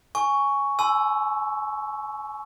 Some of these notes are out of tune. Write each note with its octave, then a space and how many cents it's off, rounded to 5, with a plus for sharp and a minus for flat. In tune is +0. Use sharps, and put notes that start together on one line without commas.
G#5 +0 C#6 +10
G#5 +40 C6 -30 E6 +0